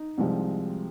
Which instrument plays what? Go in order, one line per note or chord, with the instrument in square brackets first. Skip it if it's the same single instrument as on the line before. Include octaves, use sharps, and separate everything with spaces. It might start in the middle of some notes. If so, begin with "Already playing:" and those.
Already playing: [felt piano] D#4
C2 C3 F3 G#3